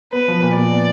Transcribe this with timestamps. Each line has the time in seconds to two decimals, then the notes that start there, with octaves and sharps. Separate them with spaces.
0.13 B3 B4
0.28 F3
0.42 A#2
0.56 A#2 D5
0.71 B3